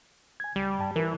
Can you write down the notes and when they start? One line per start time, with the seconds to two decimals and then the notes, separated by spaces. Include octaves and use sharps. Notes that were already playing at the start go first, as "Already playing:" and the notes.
0.40 G#5 G#6
0.56 C#2 G3
0.79 G2 A5
0.96 E3 E4 A#4